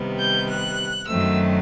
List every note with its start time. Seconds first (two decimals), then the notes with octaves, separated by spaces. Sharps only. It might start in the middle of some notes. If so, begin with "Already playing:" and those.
Already playing: C3 D#3 G3 B3
0.19 G6
0.49 F#6
1.08 F#2 D#3 F#3 A3 C4 E6